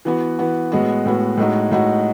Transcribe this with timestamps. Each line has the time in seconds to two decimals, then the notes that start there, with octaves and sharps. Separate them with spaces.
0.05 E3 B3 F#4
0.39 E3 B3 F#4
0.72 A2 G#3 B3 F#4
1.05 A2 G#3 B3 F#4
1.37 A2 G#3 D#4 F#4
1.71 A2 G#3 D#4 F#4